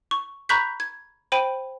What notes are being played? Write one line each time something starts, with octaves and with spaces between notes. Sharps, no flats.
C#6
A#5 B5 C#6 F#6 G6 B6
G#6
C5 G5 B5 D#7